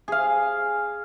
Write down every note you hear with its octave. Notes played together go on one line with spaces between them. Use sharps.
G#4 F5